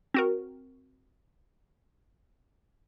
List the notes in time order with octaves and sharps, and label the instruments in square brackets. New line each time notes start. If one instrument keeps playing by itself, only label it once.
[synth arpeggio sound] C4 F#4 A#4